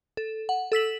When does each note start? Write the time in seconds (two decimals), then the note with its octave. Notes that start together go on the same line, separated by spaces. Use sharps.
0.17 A4
0.49 F#5
0.72 A4 E6 B6 F#7